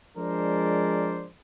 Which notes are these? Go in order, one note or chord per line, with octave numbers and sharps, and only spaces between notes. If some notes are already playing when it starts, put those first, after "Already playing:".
F3 G#3 D4 A#4 C5 D5